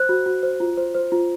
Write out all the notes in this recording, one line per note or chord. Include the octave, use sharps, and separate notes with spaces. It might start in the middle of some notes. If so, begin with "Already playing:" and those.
Already playing: C5 F#6
F#4
F#4
C5
F4
C5
C5
F4